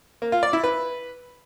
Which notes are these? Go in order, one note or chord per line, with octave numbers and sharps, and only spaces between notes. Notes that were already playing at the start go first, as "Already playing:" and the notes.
A#3
F4
D5
E4
B4